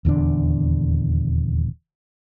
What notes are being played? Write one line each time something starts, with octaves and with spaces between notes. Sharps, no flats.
D#1 E2 D3 D4